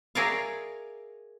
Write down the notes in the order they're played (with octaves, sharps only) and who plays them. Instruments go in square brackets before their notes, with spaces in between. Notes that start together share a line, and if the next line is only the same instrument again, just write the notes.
[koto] G#4 A#4 C#5 D5 E5 F5